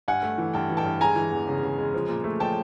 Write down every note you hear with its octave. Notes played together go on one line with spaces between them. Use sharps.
G2 F#5 G#5
A3
E3
G2 G5 A5
E3
G5 A5
G2
G#3 G#5 A#5
E3
E2
C#3
C#3
G#3
F3
A#2
A3
F3 G5 A5